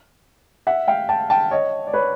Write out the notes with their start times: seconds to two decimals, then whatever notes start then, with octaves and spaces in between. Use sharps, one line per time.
0.67 E5 F#5
0.88 F5 G5
1.09 G5 A5
1.30 G5 A5
1.51 C#5 D#5
1.87 D5
1.93 B4 C#5